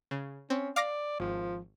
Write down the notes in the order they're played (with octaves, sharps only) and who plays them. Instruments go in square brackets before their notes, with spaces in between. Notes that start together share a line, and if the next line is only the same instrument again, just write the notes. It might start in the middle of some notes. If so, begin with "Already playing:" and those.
[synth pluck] C#3
[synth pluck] C4 [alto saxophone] C#4
[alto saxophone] D5 [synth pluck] F5 D6 A#6
[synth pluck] G#1 [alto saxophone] F3